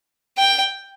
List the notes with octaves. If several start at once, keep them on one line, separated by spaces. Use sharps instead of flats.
G5